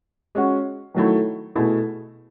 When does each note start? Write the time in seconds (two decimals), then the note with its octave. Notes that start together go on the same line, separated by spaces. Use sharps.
0.35 G#3 C#4 F#4
0.94 D#3 F#3 A3 E4
1.55 B2 A3 E4 G#4